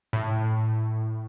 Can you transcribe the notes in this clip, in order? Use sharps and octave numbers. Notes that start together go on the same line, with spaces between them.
A2